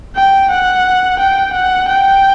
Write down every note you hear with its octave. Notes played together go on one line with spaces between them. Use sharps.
G5
F#5
G5
F#5
G5